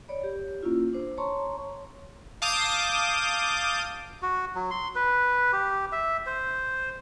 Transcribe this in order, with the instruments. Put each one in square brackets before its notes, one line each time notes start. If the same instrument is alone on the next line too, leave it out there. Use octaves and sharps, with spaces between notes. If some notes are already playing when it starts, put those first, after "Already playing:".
[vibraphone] C#5 D5 B5
G4
A#3 C#4 E4 F4
D4 C5
C#5 A5 A#5 C6 C#6
[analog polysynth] F5 A5 D6 D#6 G6 D#7
[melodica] F#4
F#3
C6
B4
G4
E5
C5